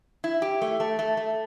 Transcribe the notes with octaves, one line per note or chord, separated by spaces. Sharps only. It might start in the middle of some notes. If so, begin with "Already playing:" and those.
E4
G4
A3
A3
A3
A3